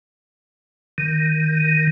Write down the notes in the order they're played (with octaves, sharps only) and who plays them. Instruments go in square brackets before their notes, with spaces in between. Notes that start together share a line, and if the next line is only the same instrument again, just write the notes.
[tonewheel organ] D#3